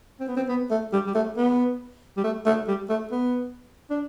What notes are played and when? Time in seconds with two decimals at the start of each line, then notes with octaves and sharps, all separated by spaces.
0.20 C4
0.28 B3
0.37 C4
0.49 B3
0.71 A3
0.93 G3
1.07 G3
1.15 A3
1.37 B3
2.17 G3
2.24 A3
2.46 A3
2.68 G3
2.90 A3
3.12 B3
3.90 D4